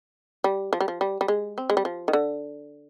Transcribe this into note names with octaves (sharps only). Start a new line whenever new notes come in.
G3
F3
G3
F3
G3
G3
G#3
C4
G#3
G3
F3
D#3
D3